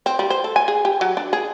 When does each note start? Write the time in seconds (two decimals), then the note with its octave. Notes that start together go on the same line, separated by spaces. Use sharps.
0.06 C4
0.19 G3
0.30 C5
0.44 A4
0.56 G#5
0.68 G#4
0.85 G4
1.01 F#3
1.17 D4
1.33 G#4